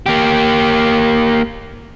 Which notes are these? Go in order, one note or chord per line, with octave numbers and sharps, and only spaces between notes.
A#3 G4